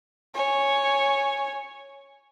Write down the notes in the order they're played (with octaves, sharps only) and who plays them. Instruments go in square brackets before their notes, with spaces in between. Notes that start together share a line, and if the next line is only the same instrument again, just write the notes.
[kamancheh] C#5 G#5